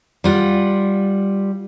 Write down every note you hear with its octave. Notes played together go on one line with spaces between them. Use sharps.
G3 F4 F#5